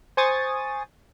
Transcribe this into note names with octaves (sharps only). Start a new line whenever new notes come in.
C5 G#5 C#6 D#6 A6